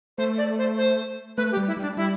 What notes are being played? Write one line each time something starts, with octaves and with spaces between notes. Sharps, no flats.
A3 C5
D5
C5
C5
A3 B4
G4
G3
E4
G3 D4
G3 E4